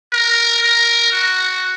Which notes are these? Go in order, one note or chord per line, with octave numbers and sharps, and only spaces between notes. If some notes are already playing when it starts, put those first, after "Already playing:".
A#4
A#4
F#4